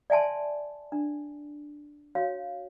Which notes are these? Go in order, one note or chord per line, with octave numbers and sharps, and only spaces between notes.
D5 E5 G#5 A5 C6
D4
F#4 C#5 F5